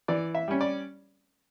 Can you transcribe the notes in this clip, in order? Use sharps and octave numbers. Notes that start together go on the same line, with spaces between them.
E3 D5
E5
G3 C#4
D5